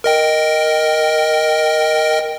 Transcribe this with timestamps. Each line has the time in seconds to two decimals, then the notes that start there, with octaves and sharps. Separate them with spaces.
0.04 A#4 D#5 G5